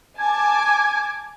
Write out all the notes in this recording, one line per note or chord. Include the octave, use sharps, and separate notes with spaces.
G#5 A5 D6 G#6